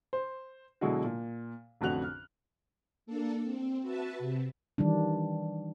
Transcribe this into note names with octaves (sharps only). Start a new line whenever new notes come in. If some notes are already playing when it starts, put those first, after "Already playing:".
C5
B2 D3 F#3 G#3 E4 F#4
A#2
A1 F2 D3 F#4 F#6 F7
F6
A#3 D4 A4
C4
F#4 B4 E5 A5
C3
D#3 E3 G3 D4